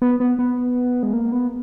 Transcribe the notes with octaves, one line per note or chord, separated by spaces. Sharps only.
B3
B3
B3
G#3
A#3
B3